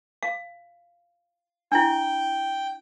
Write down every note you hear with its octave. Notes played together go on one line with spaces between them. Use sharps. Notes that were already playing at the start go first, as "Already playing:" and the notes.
F5
D4 E4 G5